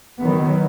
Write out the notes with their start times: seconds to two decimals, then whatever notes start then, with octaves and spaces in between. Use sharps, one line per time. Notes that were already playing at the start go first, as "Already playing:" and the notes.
0.22 D#3 F#3 B3